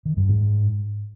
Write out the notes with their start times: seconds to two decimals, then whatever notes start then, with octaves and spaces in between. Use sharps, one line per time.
0.05 D#3
0.17 G2
0.28 G#2